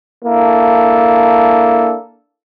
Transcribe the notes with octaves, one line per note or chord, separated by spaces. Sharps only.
A#3 D4 E4 A4